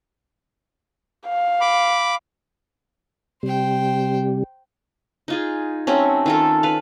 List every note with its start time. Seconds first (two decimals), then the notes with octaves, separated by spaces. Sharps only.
1.27 F5
1.61 B5 D6
3.43 C3 G3 C5 G5
5.28 D#4 F4 G#4
5.87 F#3 A3 C4 C#4
6.26 D#3 F4 A4
6.63 B4 F5